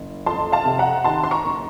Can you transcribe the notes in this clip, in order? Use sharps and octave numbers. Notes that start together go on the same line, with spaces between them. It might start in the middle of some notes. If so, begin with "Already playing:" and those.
Already playing: F#1
F2 A5 C6
F5 A5
C3
F#5 A#5
D#3 A5 C6
C6
A#5 C#6
F#1